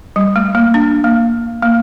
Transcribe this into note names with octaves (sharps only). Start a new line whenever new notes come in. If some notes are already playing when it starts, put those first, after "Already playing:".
G3
A3
A#3
D4
A#3
A#3